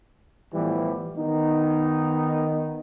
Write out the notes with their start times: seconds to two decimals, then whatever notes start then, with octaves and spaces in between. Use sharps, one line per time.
0.54 A2 E3 F3 G3 B3
1.17 D#3 B3 D#4